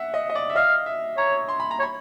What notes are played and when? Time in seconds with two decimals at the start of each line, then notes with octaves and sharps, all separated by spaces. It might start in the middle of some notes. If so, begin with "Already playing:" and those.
Already playing: E5 F#5
0.14 D#5
0.30 D#5
0.35 D5
0.50 E5
0.56 D#5 F5
0.86 E5
1.17 C#5 A#5
1.48 C6
1.60 B5
1.71 A#5
1.79 C#5
1.82 B5